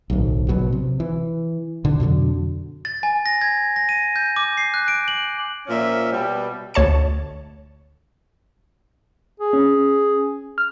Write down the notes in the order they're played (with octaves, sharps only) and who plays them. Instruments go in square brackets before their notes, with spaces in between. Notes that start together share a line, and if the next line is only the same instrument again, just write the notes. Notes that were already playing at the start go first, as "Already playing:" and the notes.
[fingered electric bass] D1 B1
A#1 B2 F#3
C3
E3
B2 D3
F2 B2 D3 F#3
[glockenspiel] A6
G#5
A#6
G#6
A#6
D#7
G6
D6
C7
F#6
D7
F#7
[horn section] A#2 F3 C#4 E5
B2 G3
[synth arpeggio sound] D2 C#5 A5 C#7
[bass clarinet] G#4
[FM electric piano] C#4
F6